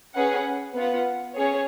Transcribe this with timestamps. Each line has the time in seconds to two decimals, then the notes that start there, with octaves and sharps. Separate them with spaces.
0.15 C#4 G#4 B4 F#5
0.75 B3 F4 B4 F#5
1.36 C#4 G#4 C#5